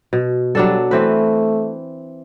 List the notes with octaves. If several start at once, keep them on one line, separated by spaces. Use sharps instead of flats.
B2
F#3 G3 D4 A4
E3 A3 C4 B4